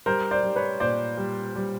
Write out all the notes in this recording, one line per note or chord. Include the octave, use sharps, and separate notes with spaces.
G3 A#4 C5
C5 D5
G3
B4 C#5
A#2 C5 D5
G3
G3